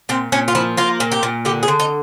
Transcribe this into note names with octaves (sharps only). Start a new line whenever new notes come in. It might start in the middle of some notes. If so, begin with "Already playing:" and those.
A#2 C4
A#2 C#4
F4
F3 E4
A#3 F4
A#2
G4
A#2
D3 G4
G#4
D3
D#4